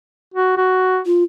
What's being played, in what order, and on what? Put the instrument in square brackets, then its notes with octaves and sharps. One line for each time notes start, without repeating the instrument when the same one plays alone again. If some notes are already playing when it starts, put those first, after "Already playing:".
[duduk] F#4
F#4
[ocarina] F4